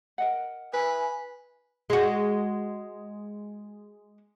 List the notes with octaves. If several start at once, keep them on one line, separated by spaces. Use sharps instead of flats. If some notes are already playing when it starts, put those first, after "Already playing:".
A#4 D#5 F#5
E4 B4 G#5
G#3 F#4